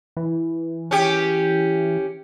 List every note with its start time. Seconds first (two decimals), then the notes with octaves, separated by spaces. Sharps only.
0.17 E3
0.91 C#4 G4